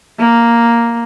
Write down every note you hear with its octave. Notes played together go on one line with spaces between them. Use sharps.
A#3